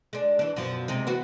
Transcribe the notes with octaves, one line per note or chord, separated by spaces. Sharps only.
G#3 D4
E3 D4
F#2 B2 F3
C3 G#3 D#4
E3 B3 F#4